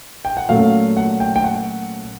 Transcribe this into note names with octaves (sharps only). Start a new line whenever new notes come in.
G5
F#5
A#2 F#3 A3 C#4 F5
F#5
G5
G5
F#5